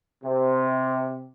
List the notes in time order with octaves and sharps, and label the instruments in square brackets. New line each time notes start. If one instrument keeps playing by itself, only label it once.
[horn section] C3